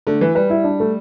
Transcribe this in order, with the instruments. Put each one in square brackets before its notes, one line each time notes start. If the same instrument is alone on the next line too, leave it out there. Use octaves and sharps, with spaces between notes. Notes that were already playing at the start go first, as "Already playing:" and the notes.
[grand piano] D3 [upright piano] A3
[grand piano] E3 [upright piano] B4
[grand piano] G3 [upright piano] B4
[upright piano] E4
D4
A3